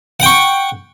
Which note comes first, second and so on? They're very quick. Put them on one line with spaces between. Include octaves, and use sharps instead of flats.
F#5 G5 C#6